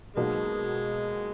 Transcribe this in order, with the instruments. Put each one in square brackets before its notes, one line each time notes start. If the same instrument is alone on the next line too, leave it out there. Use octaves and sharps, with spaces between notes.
[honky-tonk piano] B2 F#3 A#3 D#4 F#4 [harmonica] G#3